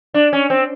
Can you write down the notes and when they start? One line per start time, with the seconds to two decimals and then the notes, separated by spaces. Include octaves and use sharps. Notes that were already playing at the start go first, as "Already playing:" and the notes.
0.14 D4
0.33 C#4
0.50 C4